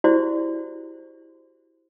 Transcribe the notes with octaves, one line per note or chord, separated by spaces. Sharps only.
E4 F#4 G4 C5 D5